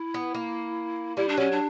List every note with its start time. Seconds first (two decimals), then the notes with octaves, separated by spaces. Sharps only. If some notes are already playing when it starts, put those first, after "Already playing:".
Already playing: E4
0.14 B3
0.35 A#3
1.17 G3 E4
1.28 D4
1.37 F#3 C#4
1.51 D4